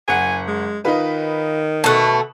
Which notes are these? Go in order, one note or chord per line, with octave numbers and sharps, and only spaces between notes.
F#1 F#5 G#5
G#3
D#3 D#4 F4 B4
B2 A3 A5 F#6